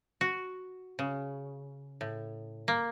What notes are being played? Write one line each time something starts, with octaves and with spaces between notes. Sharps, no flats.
F#4
C#3
A2
A#3